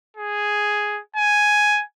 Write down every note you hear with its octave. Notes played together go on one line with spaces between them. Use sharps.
G#4
G#5